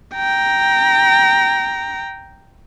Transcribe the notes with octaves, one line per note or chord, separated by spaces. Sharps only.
G5 A#5